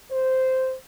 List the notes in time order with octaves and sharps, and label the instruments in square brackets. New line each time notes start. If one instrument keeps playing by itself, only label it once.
[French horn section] C5